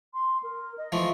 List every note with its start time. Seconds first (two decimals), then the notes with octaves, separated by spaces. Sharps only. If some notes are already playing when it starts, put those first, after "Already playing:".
0.14 C6
0.43 A#4
0.78 D#5
0.92 E3 F3 A3